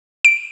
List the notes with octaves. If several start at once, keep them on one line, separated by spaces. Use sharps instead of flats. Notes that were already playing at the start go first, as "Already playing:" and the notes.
D7